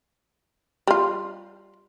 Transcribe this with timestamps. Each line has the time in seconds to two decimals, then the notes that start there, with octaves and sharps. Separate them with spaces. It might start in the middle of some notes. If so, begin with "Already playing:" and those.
0.87 G3 F4